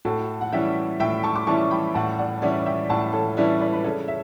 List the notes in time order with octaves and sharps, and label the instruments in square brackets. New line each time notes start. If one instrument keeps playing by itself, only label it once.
[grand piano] A2 [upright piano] F#4 A4
[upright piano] F#5
[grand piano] E3 G3 C#4 E4 [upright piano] E5 G5
[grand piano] A2 [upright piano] E5 G5
[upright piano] A5 C#6
D6
[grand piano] E3 G3 C#4 E4 [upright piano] A5 C#6
[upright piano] G5 B5
[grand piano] A2 [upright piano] F#5 A5
[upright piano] D5 F#5
[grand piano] E3 G3 C#4 E4 [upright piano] D5 F#5
[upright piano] E5 G5
[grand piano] A2 [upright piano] F#5 A5
[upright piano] A4 C#5
[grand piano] E3 G3 C#4 E4 [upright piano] B4 D5
[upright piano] B4 D5
B4
[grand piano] C#3 [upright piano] A4 C#5
[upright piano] E5